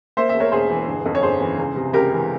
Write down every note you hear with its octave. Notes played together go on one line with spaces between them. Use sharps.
A#3 C5 E5
E5
E2
A#4 C#5
E1 G#4 C5
E3
G1
F2
C#5
G1 G#4 C5
E3
C#2
C3
C#2 G4 A#4
E3